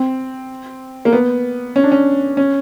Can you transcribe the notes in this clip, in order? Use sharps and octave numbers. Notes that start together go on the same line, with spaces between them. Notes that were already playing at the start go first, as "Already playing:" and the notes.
Already playing: C4
A#3
B3
C#4
D4
C#4
C#4